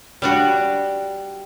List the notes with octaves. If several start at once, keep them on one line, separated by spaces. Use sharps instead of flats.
G3 D4 F#4